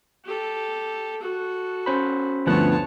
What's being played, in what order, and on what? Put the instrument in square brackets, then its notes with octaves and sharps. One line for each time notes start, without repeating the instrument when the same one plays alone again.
[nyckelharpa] G4 A4
F#4 A4
[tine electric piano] C#4 C5 B5
[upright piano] D2 G2 [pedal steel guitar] F3 B3 F#5 [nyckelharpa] C#5 A5